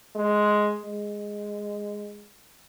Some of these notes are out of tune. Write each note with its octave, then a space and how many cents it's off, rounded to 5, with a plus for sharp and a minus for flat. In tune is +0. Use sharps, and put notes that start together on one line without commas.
G#3 +5
G#3 -5